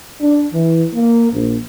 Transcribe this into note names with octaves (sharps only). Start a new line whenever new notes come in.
D4
E3
A#3
A#1